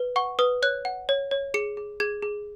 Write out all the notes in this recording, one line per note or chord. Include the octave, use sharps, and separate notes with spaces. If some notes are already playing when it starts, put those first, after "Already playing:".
Already playing: B4
F#5 C#6
B4 D#6
C#5 F#6
F#5
C#5
C#5
G#4 C#7
G#4
G#4 G#6
G#4